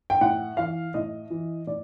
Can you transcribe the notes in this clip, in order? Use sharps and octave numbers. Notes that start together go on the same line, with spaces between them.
G5
A2 F#5
E3 F5
A2 D#5
E3
A2 D5